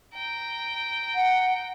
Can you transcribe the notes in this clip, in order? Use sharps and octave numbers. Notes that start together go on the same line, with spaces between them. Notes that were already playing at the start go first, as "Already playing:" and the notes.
G5 A#5
F#5